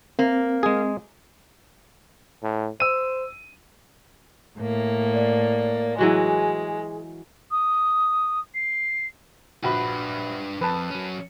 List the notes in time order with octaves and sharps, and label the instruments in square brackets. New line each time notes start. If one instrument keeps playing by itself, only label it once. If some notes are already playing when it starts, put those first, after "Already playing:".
[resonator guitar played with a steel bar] A#3 [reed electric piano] C4
[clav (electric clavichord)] G#3 G#4
[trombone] A2
[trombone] C5 [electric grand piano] E6 D#7
[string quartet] A2 A#3
[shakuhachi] D5
[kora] E3 F#3 F#4 [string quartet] G#3 [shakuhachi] G#4
[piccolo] D#6
C7
[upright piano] A#1 F#4 B5 [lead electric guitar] D4 B4
[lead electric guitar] F2 [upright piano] B4 A5
[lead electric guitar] F#3 C#4